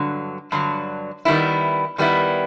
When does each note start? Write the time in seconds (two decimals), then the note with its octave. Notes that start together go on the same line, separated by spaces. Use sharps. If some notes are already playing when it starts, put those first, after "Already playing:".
Already playing: G2 D3 F#3
0.52 G2 D3 F#3
1.25 D#3 G3 B3 E4
1.98 D#3 G3 B3 E4